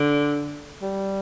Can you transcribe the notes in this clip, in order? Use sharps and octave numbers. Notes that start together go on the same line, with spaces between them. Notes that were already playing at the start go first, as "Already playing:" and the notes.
Already playing: D3
G3